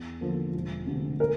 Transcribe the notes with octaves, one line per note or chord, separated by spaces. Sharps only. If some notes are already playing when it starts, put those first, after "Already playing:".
Already playing: E2
D3 F3 A#3
E1
D2 C3
A#4